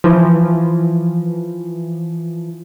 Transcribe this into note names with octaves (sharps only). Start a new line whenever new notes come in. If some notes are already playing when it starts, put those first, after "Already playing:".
E3 F3